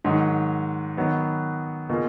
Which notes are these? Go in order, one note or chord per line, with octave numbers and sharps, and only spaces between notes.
G#2 D#3 F#3
D#3 F#3 B3
B2 A#3 F4 G#4